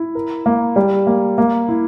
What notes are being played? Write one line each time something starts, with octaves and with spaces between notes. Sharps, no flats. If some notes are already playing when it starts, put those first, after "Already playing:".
Already playing: E4
A#4
A#3
G3
A#3
A#3
E4